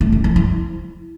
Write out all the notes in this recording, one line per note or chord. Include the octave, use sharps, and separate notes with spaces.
A3
C#4
F3
E4